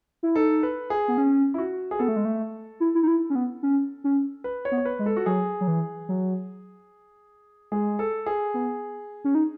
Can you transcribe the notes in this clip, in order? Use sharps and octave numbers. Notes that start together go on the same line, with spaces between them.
E4
D#4 A4
B4
G#4
B3
C#4
E4
F#4
G#4
B3 A4
A3
G#3
A3
E4
E4
D#4
E4
C#4
B3
C#4
C#4
B4
C#5
B3
C#5
B4
G#3
A4
F#4
F#3 G#4
F#3
E3
F#3
G#3 G#4
A4
G#4
B3
C#4
D#4